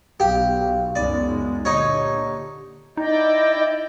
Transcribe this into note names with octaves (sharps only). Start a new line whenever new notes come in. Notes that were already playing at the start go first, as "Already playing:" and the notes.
B1 G4 F5
C#2 F#2 G#3 B3 D#4 D5
A#2 D3 D#4 G4 C#5
D#4 E4 D5 D#5 G5